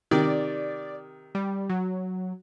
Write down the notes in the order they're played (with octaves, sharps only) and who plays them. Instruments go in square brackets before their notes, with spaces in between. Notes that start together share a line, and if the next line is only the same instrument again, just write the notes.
[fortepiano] C3 D#3 [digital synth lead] D5
[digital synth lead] G3
F#3